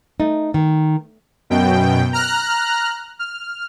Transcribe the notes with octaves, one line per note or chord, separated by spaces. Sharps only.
A3 D#4
D#3
F#2 B2 G5
A#5 F6 F#6
F6